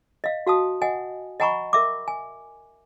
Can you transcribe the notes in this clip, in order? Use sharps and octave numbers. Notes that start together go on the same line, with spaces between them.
D#5 F5
F#4 F5 A5 D#6
D#5 F#5 G#5
D#5 F#5 G#5 A#5 B5 C#6
A#4 E5 D6
G#5